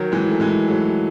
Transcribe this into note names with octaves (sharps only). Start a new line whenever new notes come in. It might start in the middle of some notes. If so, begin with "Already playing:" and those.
Already playing: D#3 F#3
E3 G#3
A3
E3 G#3
F#3 A3